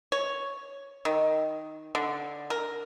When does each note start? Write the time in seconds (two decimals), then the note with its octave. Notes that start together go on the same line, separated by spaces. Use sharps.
0.12 C#5
1.05 D#3
1.95 D3
2.50 A#4